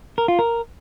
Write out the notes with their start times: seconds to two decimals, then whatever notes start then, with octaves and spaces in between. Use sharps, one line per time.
0.18 A#4
0.28 F4
0.39 A#4